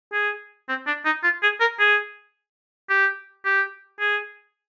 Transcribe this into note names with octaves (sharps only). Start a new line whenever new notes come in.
G#4
C4
D4
D#4
F4
G#4
A#4
G#4
G4
G4
G#4